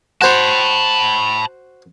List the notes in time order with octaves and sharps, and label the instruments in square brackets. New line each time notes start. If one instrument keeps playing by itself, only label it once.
[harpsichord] F#4 C5 [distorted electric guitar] A5 B5